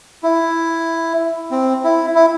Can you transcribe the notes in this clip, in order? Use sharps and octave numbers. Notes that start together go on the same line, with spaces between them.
E4
C4
E4
E4